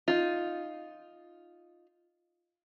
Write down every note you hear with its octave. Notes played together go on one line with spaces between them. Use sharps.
D#4 F4